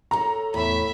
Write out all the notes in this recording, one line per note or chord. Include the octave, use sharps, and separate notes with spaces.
A4 A#4 C#5 A#5
E2 A2 E5 B5